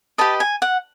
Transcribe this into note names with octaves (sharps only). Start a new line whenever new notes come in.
G4 B4 D#5 A5
G#5
F#5